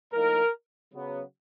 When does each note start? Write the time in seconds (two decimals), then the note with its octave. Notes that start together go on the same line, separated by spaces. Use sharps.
0.13 A2 F3 A#3 D#4 A#4
0.94 C#3 F#3 B3